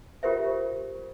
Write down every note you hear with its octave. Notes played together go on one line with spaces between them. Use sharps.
F4 G4 A#4 C5 E5